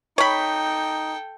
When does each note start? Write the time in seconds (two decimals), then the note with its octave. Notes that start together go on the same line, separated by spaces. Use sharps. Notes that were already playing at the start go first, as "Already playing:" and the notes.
0.18 D#4 A4 C#5 G5 B5